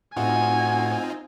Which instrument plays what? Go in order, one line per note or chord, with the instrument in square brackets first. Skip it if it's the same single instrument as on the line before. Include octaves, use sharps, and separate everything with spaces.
[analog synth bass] A2 [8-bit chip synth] C4 D#4 F4 [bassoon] F#4 [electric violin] G#5